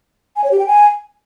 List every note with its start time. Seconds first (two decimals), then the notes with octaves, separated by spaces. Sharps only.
0.36 G#5
0.44 C#5
0.51 G4
0.59 G5
0.67 G#5